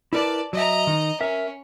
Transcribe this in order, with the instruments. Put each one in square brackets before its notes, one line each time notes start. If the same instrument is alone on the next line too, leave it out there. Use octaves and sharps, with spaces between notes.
[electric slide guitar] E4 A#4 B4 [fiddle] D5 A5
[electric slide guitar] F#3 E5 [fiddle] D#5 A#5
[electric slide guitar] D#3 D#4
[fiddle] C#4 [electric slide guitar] A#4 E5